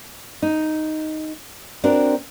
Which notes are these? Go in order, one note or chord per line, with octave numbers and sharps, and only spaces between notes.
D#4
C4 D4 F#4 A#4